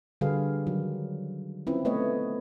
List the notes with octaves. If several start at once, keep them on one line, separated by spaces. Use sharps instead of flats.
D3 G3 F#4 G#4 B4 F5
D#3 F#3
C4 C#4 E4 F4 B4
A3 B3 B4 C#5 D#5